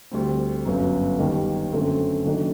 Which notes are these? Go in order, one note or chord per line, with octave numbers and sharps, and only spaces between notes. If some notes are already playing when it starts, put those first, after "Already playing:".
D2 D3 G3 C4
G1 F#2 F#3
D#2 D#3 G3
F#2 D3 A3 C4
F#1 F#2 D#3 A3 D4